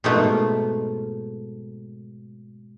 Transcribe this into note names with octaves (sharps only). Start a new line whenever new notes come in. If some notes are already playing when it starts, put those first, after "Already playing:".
G#2 B2 A3 A#3 F4